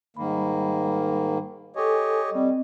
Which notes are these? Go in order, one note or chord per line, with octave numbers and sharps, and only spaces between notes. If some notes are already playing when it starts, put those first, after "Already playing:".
G#2 D#3 G3 A#3 B5
G4 A4 C#5 D#5 G#5
G3 C4 D#5